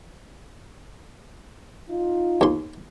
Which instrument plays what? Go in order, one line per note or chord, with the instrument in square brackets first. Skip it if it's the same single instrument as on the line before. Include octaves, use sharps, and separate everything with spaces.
[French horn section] D#4 F4
[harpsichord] D#2 C6